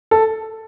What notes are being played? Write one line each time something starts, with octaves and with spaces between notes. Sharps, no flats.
A4